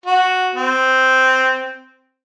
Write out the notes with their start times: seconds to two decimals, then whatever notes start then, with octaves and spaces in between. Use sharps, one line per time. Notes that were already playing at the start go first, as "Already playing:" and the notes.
0.06 F#4
0.55 C4